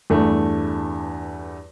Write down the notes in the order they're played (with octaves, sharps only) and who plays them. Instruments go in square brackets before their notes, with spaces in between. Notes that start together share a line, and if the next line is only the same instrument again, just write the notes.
[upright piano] E2 G2 A3